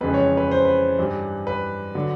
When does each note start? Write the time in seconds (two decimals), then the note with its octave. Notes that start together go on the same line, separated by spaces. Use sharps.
0.01 F2 C#3 E3 G#3 B4
0.14 C#5
0.37 B4
0.51 C5
0.65 B4
0.99 G2 E3 G3
1.47 B4
1.95 D3 F#3